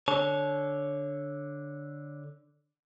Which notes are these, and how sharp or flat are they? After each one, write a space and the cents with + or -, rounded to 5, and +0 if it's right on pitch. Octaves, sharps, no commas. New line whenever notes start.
D3 +0 C#5 +0 A5 -40